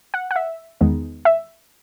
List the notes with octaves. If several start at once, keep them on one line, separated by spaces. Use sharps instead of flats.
F#5
F#5
E5
E2 D#3 G#3 B3 D#4
E5